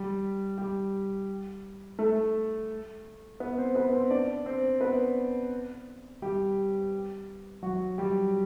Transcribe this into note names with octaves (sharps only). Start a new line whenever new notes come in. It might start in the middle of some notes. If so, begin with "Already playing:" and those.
Already playing: G3 G4
G3 G4
A3 A4
B3 B4
C4 C5
B3 B4
C4 C5
D4 D5
C4 C5
B3 B4
G3 G4
F#3 F#4
G3 G4